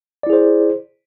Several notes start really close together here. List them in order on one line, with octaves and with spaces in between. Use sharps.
D5 E4 G#4 C5